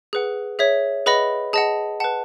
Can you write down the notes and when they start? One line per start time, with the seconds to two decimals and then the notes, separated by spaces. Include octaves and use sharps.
0.13 G#4 B4 F#5
0.59 G#4 C#5 E5
1.06 G#4 B4 D#5 F#5 B5
1.53 G#4 D#5 F#5 A5
2.00 B4 F#5 A5